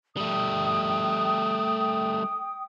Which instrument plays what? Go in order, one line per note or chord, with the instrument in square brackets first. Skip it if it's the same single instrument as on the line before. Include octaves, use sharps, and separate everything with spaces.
[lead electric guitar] G3 A3 [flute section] G5 D#6